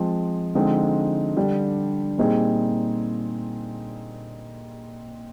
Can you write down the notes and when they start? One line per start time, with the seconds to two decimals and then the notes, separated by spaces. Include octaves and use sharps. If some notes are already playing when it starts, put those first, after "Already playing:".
Already playing: F3 G#3 C4
0.55 D3 F3 G#3 C4 D#4
1.37 D3 G3 D4 G4
2.18 A#2 G3 C4 D#4 G#4